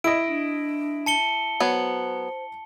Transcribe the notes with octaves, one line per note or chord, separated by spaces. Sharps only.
E4 D#5 D7
D4
A5 C#7 G7
F#3 B3 C5